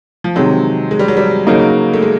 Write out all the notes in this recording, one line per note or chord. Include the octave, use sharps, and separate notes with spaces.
F3
C3 D#3 F#3 G#3 C4 D#4
G#3
G3
F#3
G3
C#3 F#3 A#3 D#4
A3
G#3